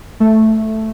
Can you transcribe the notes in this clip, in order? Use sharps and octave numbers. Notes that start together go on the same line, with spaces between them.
A3